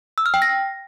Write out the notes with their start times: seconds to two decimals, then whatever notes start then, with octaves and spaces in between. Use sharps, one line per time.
0.18 E6
0.26 F6
0.34 G5
0.42 A#6